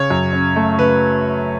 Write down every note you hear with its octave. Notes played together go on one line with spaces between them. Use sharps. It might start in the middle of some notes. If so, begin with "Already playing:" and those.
Already playing: C#3 C#5
F#2
C#4
A3
C#3 B4